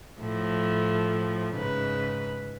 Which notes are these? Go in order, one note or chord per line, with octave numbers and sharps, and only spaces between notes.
A2 F3
G#2 C#3 B4